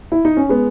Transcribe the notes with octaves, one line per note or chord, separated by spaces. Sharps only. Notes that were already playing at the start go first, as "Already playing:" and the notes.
E4
D#4
C#4
G#3 B3